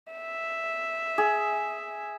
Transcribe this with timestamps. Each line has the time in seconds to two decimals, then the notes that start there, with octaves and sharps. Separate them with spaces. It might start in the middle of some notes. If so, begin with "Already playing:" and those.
0.13 E5
1.18 G#4